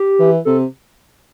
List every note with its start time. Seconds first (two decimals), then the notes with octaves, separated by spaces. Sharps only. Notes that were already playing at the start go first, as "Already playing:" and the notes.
Already playing: G4
0.19 E3
0.45 C3 A4